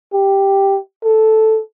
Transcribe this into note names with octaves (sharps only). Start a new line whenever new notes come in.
G4
A4